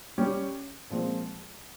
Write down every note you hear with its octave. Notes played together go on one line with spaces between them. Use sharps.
G3 C#4 G4
A#2 F3 G#3 C4